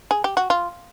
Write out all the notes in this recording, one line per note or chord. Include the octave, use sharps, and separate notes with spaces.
G#4
G4
F#4
F4